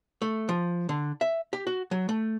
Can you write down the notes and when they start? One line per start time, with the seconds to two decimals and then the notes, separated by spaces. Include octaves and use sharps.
0.22 A3
0.49 F3
0.89 D3
1.21 E5
1.53 G4
1.67 F#4
1.91 F#3
2.09 A3